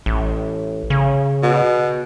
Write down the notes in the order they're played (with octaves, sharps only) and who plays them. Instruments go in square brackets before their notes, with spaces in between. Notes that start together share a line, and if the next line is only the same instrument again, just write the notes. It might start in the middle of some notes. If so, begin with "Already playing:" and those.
[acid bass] A1
C#3
[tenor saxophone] B2